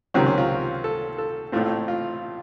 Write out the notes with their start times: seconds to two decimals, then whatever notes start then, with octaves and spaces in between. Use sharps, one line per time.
0.14 C#2 C3 D#3 F#3 C4 C#4
0.26 C#4
0.38 F4
0.84 A4
1.18 A4
1.52 A1 A2 A3 C4 F4
1.88 F4